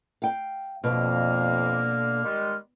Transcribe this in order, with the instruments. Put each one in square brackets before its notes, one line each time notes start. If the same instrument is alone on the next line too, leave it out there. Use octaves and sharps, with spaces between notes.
[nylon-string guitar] F5 G5
[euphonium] F2 [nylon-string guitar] B2 [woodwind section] D3 A#3 [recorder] F6
[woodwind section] D#3 G3 G#3